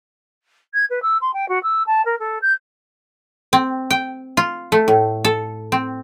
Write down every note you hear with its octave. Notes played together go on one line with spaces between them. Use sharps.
G#6
B4
E6
C6
G5
F#4
E6
A5
A#4
A4
G6
C4
G5
F4
A3
A2
A4
C4